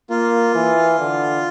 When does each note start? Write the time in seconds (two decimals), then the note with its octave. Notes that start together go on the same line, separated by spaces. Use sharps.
0.10 A#3 F4
0.55 E3
1.00 D3